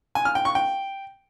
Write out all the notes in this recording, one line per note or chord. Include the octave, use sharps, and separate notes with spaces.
G#5
F6
G5
C#6
G5